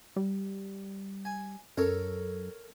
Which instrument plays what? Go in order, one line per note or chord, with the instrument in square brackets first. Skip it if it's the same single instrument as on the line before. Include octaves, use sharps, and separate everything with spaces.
[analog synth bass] G3
[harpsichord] G#5
[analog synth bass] F#2 [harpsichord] A4 A#4 C#5